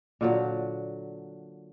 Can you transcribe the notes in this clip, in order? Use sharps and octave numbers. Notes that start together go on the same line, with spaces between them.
A#2 D3 F#3